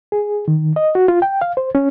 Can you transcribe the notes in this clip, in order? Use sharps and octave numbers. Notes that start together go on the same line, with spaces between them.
G#4
D#3
D#5
F#4
F4
G5
F5
C5
C#4